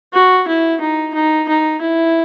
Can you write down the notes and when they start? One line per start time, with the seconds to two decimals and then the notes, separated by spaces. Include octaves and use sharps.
0.13 F#4
0.48 E4
0.81 D#4
1.14 D#4
1.49 D#4
1.81 E4